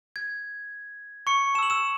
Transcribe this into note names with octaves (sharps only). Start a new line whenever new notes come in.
G#6
C#6 C#7
A5 E6 E7
F#7
E6 E7